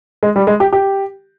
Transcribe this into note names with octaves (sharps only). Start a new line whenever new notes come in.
G#3
G3
G#3
G4
G4